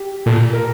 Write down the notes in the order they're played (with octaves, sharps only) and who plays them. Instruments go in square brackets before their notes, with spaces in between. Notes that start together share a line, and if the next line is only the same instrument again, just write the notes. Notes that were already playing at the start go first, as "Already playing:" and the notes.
Already playing: [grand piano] G4
[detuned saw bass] A#2 [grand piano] A4
[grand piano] A#4